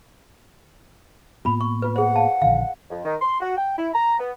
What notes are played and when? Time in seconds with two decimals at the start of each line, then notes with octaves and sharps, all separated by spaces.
1.45 A2 A#3 B3 F4 B5
1.61 C#6
1.82 F4 B4
1.96 G#4 C5 F#5
2.16 F5 A5
2.42 A#1 D3 D#3 F5
2.90 F2
3.05 D#3
3.22 C6
3.41 F#4
3.57 G5
3.78 E4
3.94 A#5
4.19 B3